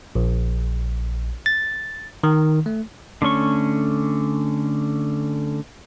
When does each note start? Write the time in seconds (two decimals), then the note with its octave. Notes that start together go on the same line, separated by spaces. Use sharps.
0.15 A#1
1.46 A6
2.23 D#3
2.66 A3
3.22 D3 A3 C#4 C#6